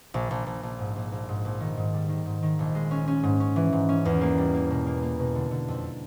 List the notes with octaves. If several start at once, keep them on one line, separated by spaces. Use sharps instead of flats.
A#1
A#1
A#1
A#1
G#2
A#1
A#1
G#2
A#1
D#3
G#2
G3
D#3
G#2
D#3
A#1
G#3
C#4
C#4
G#2
C#4
E3
G#2
C#4
E2
A#3
G3
A#3
B2
A#3
A#3
B2
D3
D3
F2